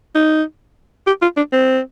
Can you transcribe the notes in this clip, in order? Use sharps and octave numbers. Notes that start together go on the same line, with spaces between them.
D#4
G4
F4
D4
C4